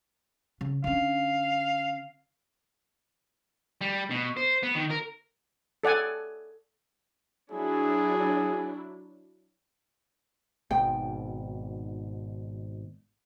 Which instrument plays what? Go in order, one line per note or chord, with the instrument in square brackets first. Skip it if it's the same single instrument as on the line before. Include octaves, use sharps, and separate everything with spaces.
[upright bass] C#3
[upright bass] D3 C#4 [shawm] F5
[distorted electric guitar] G3
B2
C5
B3
D#3
A#4
[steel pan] A4 D5 F#5 G#5
[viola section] F#3 D4 E4 [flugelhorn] G#4
[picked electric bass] G#1 G#2 B2 [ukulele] G5